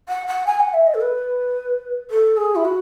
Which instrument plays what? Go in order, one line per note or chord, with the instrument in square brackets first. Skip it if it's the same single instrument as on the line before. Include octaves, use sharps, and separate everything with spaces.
[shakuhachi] F#5
F#5
G#5
F#5
E5
D#5
A4
B4
A4
G#4
E4
F#4